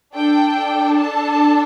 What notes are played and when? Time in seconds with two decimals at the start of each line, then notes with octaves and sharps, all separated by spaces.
0.15 D4 A4 G5
0.98 A5